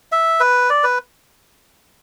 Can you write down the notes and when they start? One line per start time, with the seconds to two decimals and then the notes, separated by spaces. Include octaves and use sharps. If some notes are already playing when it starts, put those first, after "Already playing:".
0.12 E5
0.40 B4
0.70 D5
0.84 B4